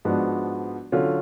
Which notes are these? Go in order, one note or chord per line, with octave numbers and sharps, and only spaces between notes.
G#2 F3 B3 D4 F#4
D3 F#3 C#4 F4